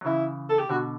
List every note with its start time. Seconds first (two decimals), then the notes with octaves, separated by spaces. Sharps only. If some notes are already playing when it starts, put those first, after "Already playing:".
0.01 F#3
0.05 C#3 E3 E4
0.49 A4
0.59 G4
0.69 B2 D3 F#4